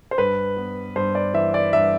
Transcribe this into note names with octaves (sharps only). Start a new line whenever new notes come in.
C5
G2 B4
B3
G2 C5
D5
E3 E5
D5
G2 E5